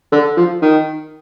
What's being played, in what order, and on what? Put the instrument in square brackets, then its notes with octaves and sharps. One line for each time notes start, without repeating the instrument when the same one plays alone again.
[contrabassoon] D3
F3
D#3